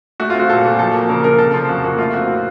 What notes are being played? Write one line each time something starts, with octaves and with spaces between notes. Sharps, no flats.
A3 F#4
F4
C4 F#4
A#2 A4
A#2 F#4
F3 A4
A#3
C#3 A#4
C#3 A#4
C3 A4
F3 F4
F2 F#4
A#3 F#4
A3 F4
C4 F#4
A2